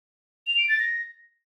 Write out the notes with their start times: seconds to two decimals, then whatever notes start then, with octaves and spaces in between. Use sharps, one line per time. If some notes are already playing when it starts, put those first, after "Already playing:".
0.47 F7
0.58 D7
0.69 A6
0.80 A#6